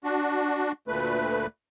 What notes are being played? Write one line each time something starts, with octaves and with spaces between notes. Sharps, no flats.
D4 F#4
D2 A#2 A3 B4